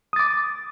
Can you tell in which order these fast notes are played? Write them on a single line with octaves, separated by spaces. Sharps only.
D#6 A6 D6